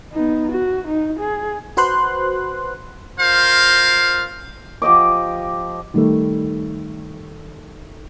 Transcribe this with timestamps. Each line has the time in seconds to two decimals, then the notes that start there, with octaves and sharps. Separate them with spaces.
0.12 B3 D#4
0.52 F#4
0.88 D#4
1.19 G#4
1.77 F#4 B4 C5 C6 F#6
3.21 F4 A#4 C5 F5
4.82 F3 G4 D#5 D6
5.94 D#3 G3 A3